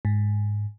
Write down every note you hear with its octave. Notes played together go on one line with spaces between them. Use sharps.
G#2